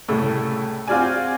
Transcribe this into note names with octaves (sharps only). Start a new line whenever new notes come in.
C2 A2 C#3 A3 E6
C4 F4 F#4 D5 G#5